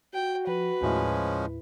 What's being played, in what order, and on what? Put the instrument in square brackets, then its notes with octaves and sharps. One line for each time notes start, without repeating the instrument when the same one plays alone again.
[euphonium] F#4 [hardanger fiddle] G5
[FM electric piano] F3 [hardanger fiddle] B4
[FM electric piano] D#2 A2 E4 [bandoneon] F3 G#3 C#4